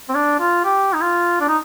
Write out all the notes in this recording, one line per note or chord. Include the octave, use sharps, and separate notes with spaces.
C4
D4
F4
G4
D#4
F4
D4
D#4